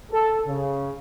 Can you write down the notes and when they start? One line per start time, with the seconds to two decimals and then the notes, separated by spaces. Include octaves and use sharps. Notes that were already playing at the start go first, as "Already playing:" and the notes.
0.12 A4
0.47 C#3